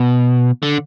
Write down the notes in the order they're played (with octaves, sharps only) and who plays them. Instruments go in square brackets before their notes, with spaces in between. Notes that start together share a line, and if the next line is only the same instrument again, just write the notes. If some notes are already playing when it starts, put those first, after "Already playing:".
Already playing: [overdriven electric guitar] B2
D3